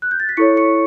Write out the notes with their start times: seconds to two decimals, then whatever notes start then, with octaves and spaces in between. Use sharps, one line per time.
0.02 F#6
0.11 G6
0.20 A6
0.29 B6
0.37 E4 A4 C#5 C#6 C#7
0.57 C#6 C#7